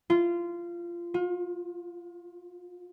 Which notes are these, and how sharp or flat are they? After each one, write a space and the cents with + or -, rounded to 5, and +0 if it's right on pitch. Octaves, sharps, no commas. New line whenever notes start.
F4 -20
F4 +35